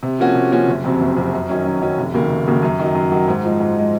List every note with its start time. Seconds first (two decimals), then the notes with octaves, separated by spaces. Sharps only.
0.03 C3
0.19 F3 A#3 C#4 F#4
0.35 C3
0.52 F3 A#3 C#4 F#4
0.68 F#1
0.84 F2 C3 F#3
1.01 F#1
1.16 F2 C3 F#3
1.33 F#2
1.49 D#3 F#3 C#4
1.66 F#2
1.82 D#3 F#3 C#4
1.98 F1
2.14 D#2 C#3 F#3 A#3
2.30 F1
2.47 D#2 C#3 F#3 A#3
2.63 F#2
2.80 D#3 F#3
2.95 F#2
3.12 D#3 F#3
3.28 G#2
3.44 F3 G#3
3.61 G#2
3.77 F3 G#3